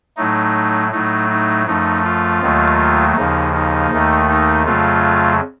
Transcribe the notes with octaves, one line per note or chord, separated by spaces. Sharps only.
A2 F#3 A3 D#4
A2 F#3 A3 D#4
D#4
F#2 F3 A3 D#4
F4
D#2 D#3 F#3 A3
D#2 C#3 F3 D#4
D#4
D#2 D#3 A3
D#4
F2 C#3 F#3 A3 F4